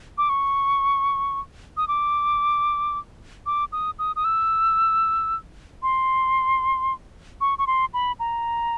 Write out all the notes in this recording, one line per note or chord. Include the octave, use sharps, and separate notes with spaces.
D6
C#6
D#6
D6
D6
D#6
D#6
D#6
E6
C6
C#6
C#6
C6
B5
A#5